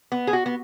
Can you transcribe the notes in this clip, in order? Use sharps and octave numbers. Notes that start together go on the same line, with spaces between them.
B3
G#4
F#4
B3